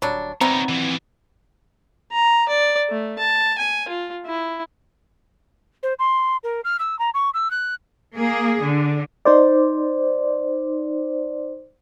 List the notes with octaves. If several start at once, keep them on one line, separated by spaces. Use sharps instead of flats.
D#1 F#3 G3 D4 C#5
C3 G3 B3 C4 D#4 C#5 A#5
E3 F3 D5
A#5
D5
A3
A5
G#5
F4
E4
C5
C6
A#4
F6
E6
A#5
C#6
E6
F#6
A#3 G#4
D3
D#4 C5 D5